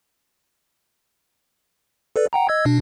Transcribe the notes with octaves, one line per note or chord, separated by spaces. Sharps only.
A4 B4 D5
F#5 G5 A#5
D#5 E6 G#6
B2 D4